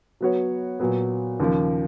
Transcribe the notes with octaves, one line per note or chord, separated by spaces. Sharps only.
F#3 B3 F#4 C#5
A#2 F#3 B3
D#2 C#3 F3 A#3